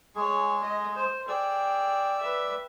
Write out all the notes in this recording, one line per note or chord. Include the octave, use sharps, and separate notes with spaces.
G#3 G#4 C#5 C#6
D#5
C5
G#4 D5 G5 E6
B4 E5